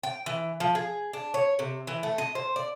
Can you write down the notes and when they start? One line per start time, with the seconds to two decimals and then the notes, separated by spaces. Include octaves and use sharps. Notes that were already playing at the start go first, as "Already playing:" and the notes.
0.03 G5
0.26 E3
0.60 F3
0.75 G#4
1.13 D4
1.34 C#5
1.59 C3
1.87 E3
2.03 A3
2.18 D#5
2.35 C5
2.56 D5